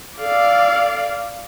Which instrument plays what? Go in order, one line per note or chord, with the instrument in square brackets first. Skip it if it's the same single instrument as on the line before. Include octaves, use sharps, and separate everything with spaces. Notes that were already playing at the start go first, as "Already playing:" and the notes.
[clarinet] A4 [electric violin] D5 F5